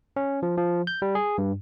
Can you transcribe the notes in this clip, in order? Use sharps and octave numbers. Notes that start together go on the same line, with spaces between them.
C#4
F3
F3
G6
G3
G#4
G2